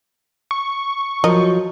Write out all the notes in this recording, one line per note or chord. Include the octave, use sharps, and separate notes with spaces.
C#6
F3 F#3 A#4 D#5